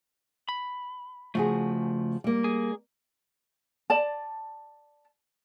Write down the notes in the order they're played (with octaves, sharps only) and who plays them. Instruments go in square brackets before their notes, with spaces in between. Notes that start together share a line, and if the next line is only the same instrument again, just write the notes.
[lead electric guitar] B5
[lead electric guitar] C#3 A3 [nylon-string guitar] F3 F#4 G#4
[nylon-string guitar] G3 A#3
[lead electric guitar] G#4
[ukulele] D5 A5